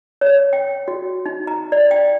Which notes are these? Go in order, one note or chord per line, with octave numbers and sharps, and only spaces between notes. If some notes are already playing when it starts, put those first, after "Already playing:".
C#5
G5
F#4
D#4
A#5
D5
G5